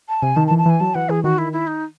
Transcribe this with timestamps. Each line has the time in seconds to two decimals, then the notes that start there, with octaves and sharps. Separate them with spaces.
0.09 A5
0.22 C3 G#5
0.36 D#3 A5
0.47 A5
0.51 E3
0.58 A5
0.66 E3 G#5
0.80 F#3 A5
0.95 E3 F#5
1.09 E3 G#4
1.23 D#3 F#4
1.38 E4
1.53 E4
1.67 D#4